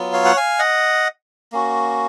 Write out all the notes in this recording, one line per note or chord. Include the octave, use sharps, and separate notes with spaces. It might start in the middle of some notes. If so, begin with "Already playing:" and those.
Already playing: F#3 B3 F4
C#5 F5
F#5
F5 G#5
D#5 F#5
A#3 C#4 F#4